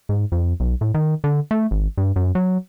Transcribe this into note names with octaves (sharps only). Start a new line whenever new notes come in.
G#2
F2
B1
A2
D#3
D3
A3
G#1
G2
F#2
F#3